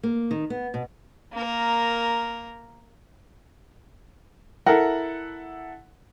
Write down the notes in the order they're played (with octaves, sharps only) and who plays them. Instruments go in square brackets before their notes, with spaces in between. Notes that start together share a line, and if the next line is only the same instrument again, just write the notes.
[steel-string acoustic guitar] A#3
D#3
B3
B2
[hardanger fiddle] A#3 A#4
[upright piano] E4 A4 F#5 [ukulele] A#4